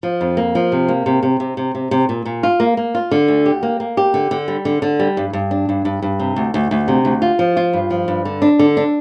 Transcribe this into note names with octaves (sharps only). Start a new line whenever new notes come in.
F3
F2
A#3
F3
C3
A#3
C3
C3
C3
C3
C3
C3
A#2
A#2
F4
A#3
A#3
F4
D3
D2
G4
A#3
A#3
G4
D3
D3
G3
D3
D3
G3
G2
G2
D4
G2
G2
G2
C3
D2
D2
D2
C3
D2
F4
F3
F4
G2
F3
G2
D3
D4
D3
D4